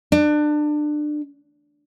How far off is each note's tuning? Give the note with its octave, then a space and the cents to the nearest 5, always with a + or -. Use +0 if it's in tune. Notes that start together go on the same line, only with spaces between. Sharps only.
D4 +25